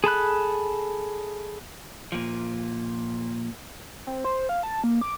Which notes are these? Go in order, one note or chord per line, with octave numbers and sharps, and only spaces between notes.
G#4 A4 B5 F#6
A#2 F3
C4
C5
F5
A5
A#3
D6